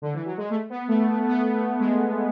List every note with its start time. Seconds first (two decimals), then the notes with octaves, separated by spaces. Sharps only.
0.02 D3
0.14 E3
0.26 F#3
0.37 G#3
0.50 A3
0.70 B3
0.88 A3
1.09 A3
1.28 B3
1.54 A3
1.80 G#3